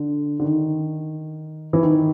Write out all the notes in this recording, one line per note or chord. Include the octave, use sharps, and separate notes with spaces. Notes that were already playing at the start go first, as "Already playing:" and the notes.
Already playing: D3
D3
D#3
E3
D#3